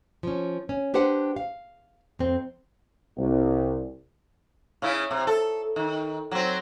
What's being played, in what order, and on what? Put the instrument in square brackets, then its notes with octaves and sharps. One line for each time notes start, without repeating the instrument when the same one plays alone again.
[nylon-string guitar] F3 C#4
C#4
D4 G4 B4 C5 F#5 G5
F5
F2 C4
[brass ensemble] C2
[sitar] C#3 C#4 E4
C3
A4
D#3
F#3 C4